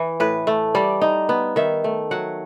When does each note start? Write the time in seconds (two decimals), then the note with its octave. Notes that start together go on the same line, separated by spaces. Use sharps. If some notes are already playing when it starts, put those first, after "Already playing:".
Already playing: E3
0.20 A2 B4
0.47 A3
0.75 G3 D5
1.01 D#4
1.29 B3
1.56 D#3 E5
1.84 A3
2.11 F#3 F#5